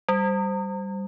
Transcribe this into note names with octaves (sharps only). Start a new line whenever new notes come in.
G3